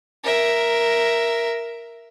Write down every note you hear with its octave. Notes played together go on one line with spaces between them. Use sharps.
A#4 E5